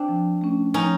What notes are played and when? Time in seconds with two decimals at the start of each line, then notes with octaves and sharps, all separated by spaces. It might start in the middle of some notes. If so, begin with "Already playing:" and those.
Already playing: C4 D4
0.09 F3
0.41 A3 C#4
0.74 F3 C#4 D#4